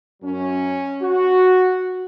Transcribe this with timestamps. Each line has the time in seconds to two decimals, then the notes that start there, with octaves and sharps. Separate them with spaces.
0.22 F#2 F#3 C#4
1.02 F#4